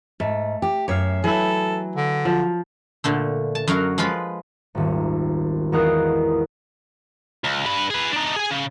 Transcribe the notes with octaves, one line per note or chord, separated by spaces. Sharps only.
G#2 A3
G4
F#2 C#5 E5 F5
E3 F#3 E4 A4
D3
F3
A#2 D3 A3
A5
F#2 F#3 F#4 A#4 F5
F3 G#3 F4 B4 B5
D#1 G#1
E2 F#4 A#4 D#5 F5 F#6
C#2
G2 B4
G#4 B4
D4 D#4
G#4 G#5
C#3